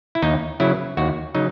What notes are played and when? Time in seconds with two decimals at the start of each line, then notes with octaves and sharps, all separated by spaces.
0.15 E4
0.22 D#2 D#4
0.60 C#3 F#3 E4
0.97 D#2 F#4
1.35 C#3 F#3 D#4